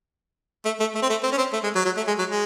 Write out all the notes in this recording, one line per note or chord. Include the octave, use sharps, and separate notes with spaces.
A3
A3
A3
C4
A3
C4
C#4
C4
A3
G#3
F#3
F#3
A3
G#3
F#3
G#3